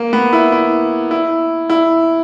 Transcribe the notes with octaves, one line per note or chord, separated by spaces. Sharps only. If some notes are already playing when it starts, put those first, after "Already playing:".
Already playing: A#3
B3
E4
E4
E4
E4